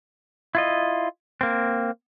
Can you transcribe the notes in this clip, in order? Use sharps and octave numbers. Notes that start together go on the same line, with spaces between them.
E4 F4 D#5
A#3 C4